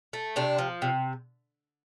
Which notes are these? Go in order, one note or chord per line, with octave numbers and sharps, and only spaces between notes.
A3
C3 D4
F3
C3